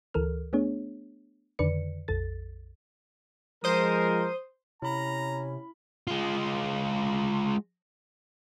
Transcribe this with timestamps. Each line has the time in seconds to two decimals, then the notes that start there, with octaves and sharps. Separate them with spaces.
0.14 D2 E3 A4 A#4 F6
0.53 A3 B3 D4 G#4 C#5
1.59 F2 D3 D#3 B4 D5 C#7
2.08 A#1 F2 A4 A6
3.64 F3 G#3 A#4 C5 D#6
4.82 C3 C#4 E4 A#5 B5
6.07 G#3 F4